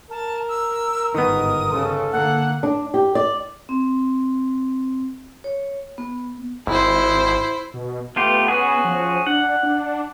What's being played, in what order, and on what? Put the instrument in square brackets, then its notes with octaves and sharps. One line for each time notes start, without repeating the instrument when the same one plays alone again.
[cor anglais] A#4 [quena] A5
[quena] E6
[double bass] G1 G#2 [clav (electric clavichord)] D#3 B3 [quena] D#6
[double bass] C#3 [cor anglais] A4
[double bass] D3 A#3 [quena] F#5
[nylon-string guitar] D4
G4
D5
[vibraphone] C4
C#5
B3
[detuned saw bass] G#1 [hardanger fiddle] E4 C5
[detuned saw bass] B2
[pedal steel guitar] A3 F4 G4 [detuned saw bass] B3
[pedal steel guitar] C#4 F#4 G#4
[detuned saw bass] F3
[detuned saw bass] D4 [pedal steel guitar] F#5
[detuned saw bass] D4